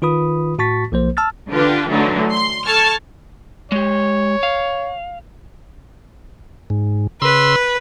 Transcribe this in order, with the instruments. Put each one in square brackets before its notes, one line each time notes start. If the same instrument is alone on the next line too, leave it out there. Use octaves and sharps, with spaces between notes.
[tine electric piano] D#3 F4 B4 B5 D#6
A2 F#4 A5 C#6 A6 B6
B1 F3 A#3 C5
A5 E6 F6 A6
[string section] D3 D4 F4 G4 B4
D3 E3 F#3 A3 D#4
C6
A4 A5 C#6 F6 G#6
[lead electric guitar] G#3 G4 [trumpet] C#5
[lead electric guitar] F5
[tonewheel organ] G#2
[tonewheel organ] C#3 C6 E6 [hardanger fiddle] B4